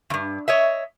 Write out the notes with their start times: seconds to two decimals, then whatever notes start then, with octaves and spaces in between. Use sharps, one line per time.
0.10 E2 G2
0.48 C#5 D#5 E5